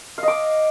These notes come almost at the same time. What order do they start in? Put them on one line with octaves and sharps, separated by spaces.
F5 D#5 D6